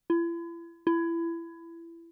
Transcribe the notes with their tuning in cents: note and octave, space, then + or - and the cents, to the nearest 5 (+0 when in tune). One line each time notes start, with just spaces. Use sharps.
E4 +40
E4 +25